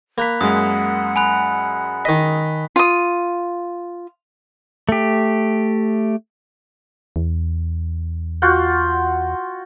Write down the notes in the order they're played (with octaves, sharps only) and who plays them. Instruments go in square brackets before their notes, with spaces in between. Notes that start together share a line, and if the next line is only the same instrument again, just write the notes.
[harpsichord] A#3 [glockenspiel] B5 F#6 B6
[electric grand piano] F#2 G#3 [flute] F#5 [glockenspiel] D#6
[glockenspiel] G#5 B5 F#6
[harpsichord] D#3 D#5 [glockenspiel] B6
[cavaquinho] F4 D#6
[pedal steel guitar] A3 G4
[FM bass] E2
[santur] F4 F#4 G5